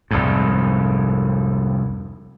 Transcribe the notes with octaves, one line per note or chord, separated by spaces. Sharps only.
C2 F2 G#2